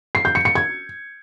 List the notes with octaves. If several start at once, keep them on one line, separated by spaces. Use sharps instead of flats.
C7
G6
C#7
C#7
G#6